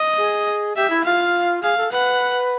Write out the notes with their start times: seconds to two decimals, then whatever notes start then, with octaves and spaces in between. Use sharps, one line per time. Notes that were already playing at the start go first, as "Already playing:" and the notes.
Already playing: D#5
0.18 G#4
0.76 G4 E5
0.90 E4
1.04 F4 F5
1.63 G#4 F5
1.77 A4
1.91 B4 F#5